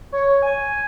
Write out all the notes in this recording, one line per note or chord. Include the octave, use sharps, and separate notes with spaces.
C#5
G#5